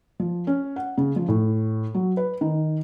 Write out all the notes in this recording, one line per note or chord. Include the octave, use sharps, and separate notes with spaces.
F3
C#4
F#5
C#3
F3
A2
F#3
B4
D#3